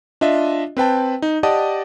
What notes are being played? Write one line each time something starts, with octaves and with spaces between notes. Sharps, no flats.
D4 F4 D#5 E5
C4 B4 G5 A5
D#4
G4 D5 D#5 F#5 A5 D#6